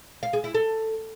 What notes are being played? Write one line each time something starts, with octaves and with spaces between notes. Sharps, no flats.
F5
G#4
E4
A4